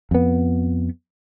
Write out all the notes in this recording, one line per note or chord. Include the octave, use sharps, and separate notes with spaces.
F2 B3